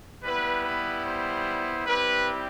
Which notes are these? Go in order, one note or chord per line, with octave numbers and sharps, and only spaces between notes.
G3 B3 E4 B4
B4
C5
G3 C4 E4 G4 B4